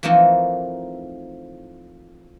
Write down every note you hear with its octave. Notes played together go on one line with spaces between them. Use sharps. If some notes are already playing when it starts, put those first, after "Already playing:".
E3 F3 A3 A#3 C4 D#4